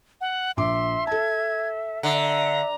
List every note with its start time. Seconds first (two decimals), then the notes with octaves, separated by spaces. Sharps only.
0.21 F#5
0.57 A#1 E5 C6 D6
1.07 A4 A5 G#6
2.03 D3 E5 A#5